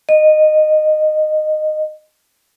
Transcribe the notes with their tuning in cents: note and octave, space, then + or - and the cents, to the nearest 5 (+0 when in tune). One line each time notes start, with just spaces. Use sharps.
D#5 -15